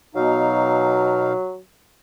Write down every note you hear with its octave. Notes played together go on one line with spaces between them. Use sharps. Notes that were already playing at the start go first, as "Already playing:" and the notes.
B2 F#3 D#4 F5